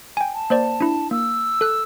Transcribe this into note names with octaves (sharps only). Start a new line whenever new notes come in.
G5 G#5
A5
A#3 C5 D5
D4 E4
A#3 E6
A4 F#6